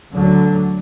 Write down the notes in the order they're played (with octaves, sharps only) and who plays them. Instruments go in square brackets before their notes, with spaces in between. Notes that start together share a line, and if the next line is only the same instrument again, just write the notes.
[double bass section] D2 D3 F#3